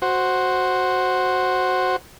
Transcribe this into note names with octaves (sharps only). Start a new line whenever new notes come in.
F#4 C5